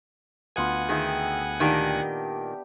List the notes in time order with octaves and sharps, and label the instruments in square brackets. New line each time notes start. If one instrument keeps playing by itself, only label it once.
[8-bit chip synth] D2 F#5 G#5 [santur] B3 F4
[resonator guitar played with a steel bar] D#3 [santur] G#4 E5 G5
[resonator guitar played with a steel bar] A#2 D#3 [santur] D4 G4 G5